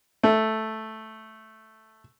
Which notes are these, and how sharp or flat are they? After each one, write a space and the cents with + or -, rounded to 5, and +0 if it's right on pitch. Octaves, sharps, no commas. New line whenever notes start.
A3 -5